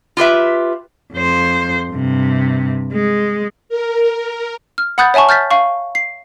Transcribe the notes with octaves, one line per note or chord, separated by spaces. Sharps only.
F4 G4 B4 E5
F2 C5
G2 C3
G#3
A#4
F6
F#5 B5 D#6 F#6 G6 A6
C#5 E5 G#5 A5 C#6
F6 G6 A6 B6
F5 C#6
C7